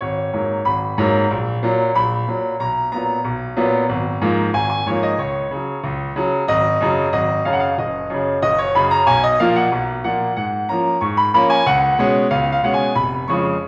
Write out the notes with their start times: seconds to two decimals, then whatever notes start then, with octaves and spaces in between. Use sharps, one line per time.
0.01 G#1 C#5
0.33 G#2 F#3 A#3
0.65 G#1 B5
0.98 G#2 F#3 A#3
1.30 A#1
1.63 A#2 F#3
1.95 A#1 B5
2.27 A#2 F#3
2.60 B1 A#5
2.92 A#2 F#3 B3 A#5
3.24 B1
3.57 A#2 F#3 B3
3.89 G#1
4.21 G#2 F3 A#3
4.54 G#1 G#5
4.70 G#5
4.86 G#2 F3 A#3 C#5
5.03 D#5
5.19 C#2 C#5
5.51 C#3 F#3
5.84 C#2
6.16 C#3 F#3
6.48 G#1 D#5
6.81 F#2 C#3 F#3
7.13 G#1 D#5
7.45 F#2 C#3 F#3 F5
7.53 F#5
7.60 F5
7.78 F#1 D#5
8.10 F#2 C#3
8.42 F#1 D#5
8.59 C#5
8.75 F#2 C#3 B5
8.91 A#5
9.07 B1 G#5
9.24 D#5
9.39 A#2 F3 A#3 F5
9.56 F#5
9.72 B1
10.04 A#2 F3 A#3 F#5
10.36 G#2 F#5
10.69 F3 A#3 C#4 A#5
11.01 G#2 C#6
11.17 B5
11.34 F3 A#3 C#4 B5
11.50 G#5
11.66 C#2 F#5
11.99 B2 G#3 C#4
12.31 C#2 F5
12.52 F5
12.63 B2 G#3 C#4 F#5
12.74 G#5
12.95 F1 B5
13.28 F2 C#3 F3 G#3 C#6